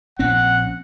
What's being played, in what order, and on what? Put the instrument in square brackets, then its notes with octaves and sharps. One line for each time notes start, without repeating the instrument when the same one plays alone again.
[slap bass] A#1 C4 C#4 [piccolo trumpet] F#5